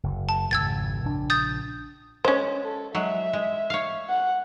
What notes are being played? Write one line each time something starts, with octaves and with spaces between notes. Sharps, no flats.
F#1
A5
G#1 F2 C#3 E6 G#6 A6
A#1 C#3 D4
D#6 G6 A6
G#3 C#4 C5
A4
F#3 G#3 E5
G#3
C#5 F5
F#5